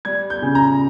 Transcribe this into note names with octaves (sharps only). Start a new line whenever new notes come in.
G3 G#6
G6
C#3
A#5